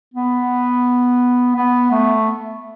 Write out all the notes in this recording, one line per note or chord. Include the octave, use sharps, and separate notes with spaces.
B3
B3
A3